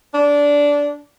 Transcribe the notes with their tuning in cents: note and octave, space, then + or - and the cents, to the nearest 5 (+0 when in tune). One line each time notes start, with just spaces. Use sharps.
D4 -15